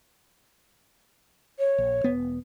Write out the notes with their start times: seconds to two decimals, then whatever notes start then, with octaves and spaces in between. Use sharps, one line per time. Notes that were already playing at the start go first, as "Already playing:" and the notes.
1.59 C#5
1.78 A#1
2.04 E1 B3